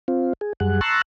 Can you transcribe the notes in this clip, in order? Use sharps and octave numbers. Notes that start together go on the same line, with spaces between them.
C4 F4
G#4
F#2 G3 G#4 F#5
A5 A#5 C6 C#6 E6 F#6